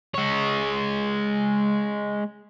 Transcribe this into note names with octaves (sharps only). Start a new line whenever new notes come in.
G#3 C#5